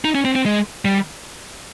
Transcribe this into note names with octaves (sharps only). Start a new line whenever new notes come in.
D#4
C#4
C4
C4
G#3
G3